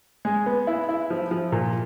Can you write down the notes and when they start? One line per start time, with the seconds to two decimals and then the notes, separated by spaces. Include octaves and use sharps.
0.25 G#3
0.46 B3
0.67 E4
0.89 E4
1.10 F3
1.31 F3
1.52 A#2